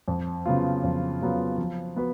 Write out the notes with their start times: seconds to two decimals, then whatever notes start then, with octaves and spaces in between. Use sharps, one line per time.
0.08 F2
0.46 C#3 F#3 B3 F4
0.84 F2
1.21 C#3 F#3 B3 F4
1.58 F3
1.96 B3 F#4 B4